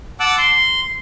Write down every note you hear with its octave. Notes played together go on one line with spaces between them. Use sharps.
F#5 A5 D6 E6 F#6
C6